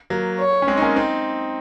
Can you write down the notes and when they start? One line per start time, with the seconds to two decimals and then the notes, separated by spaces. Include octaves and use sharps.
0.10 F#3 A#3
0.40 C#5
0.62 C#4
0.68 G#3 C4
0.77 D#4
0.82 A#3 C#4
0.96 C4 D#4